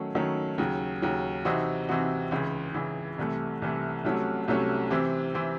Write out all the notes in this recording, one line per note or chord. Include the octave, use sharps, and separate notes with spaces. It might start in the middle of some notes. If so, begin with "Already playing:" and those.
Already playing: D#3 F#3 A3 C#4
D#3 F#3 A3 C#4
D#2 C#3 F#3
D#2 C#3 F#3
C3 E3 C4 D#4 F#4
C3 E3 C4 D#4 F#4
C#2 C#3 E3
C#2 C#3 E3
C2 C3 E3 A3
C2 C3 E3 A3
C2 C3 F#3 A3 C#4
C2 C3 F#3 A3 C#4
C3 E3 C4
C3 E3 C4